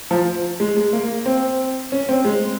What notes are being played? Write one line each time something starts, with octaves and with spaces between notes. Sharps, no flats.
F3
G#3
G#3
A#3
C4
C#4
C4
G#3